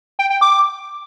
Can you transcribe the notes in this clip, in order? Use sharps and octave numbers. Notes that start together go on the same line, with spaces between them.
G5
G5
D6